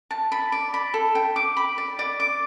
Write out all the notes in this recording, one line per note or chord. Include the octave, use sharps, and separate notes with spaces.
A5
B5
D5
B5
A4
G5
D6
B5
D5
D5
D6